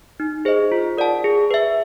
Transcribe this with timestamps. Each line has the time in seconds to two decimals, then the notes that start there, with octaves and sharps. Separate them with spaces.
0.20 D#4
0.45 G#4 C5 D#5
0.72 F4
0.97 A#4 D5 F#5 A5
1.24 G#4
1.51 B4 E5